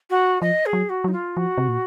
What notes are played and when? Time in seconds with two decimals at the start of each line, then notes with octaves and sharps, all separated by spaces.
0.10 F#4
0.41 F3 D#5
0.66 G#4
0.73 F#3
0.89 F#4
1.04 F#3 D#4
1.13 F4
1.36 F3 F#4
1.58 C3
1.68 A#2